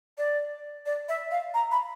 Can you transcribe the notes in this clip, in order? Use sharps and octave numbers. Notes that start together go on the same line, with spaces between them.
D5
D5
E5
F5
A#5
B5